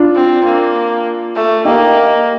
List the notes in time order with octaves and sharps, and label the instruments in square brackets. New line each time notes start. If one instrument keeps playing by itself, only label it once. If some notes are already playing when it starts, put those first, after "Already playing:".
Already playing: [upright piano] D4 F4
[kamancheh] C4
A#3
A3
[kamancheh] A#3 [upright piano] D#4 G4